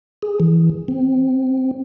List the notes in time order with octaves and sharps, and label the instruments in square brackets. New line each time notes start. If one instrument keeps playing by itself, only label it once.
[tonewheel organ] G#4
E3
C4